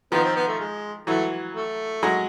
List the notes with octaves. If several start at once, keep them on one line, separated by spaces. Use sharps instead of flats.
D#3 F3 B3
C4
B3
A3
G#3
E3 F#3 A3
A3
F#3 G#3